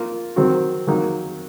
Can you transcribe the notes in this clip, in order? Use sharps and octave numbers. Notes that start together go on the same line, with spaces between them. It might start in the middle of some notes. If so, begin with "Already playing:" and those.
Already playing: A#3 F4
D#3 F#3 C4 F#4
D#3 F#3 A#3 D#4